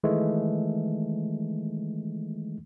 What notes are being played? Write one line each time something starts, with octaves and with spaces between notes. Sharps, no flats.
D#3 E3 G#3 A3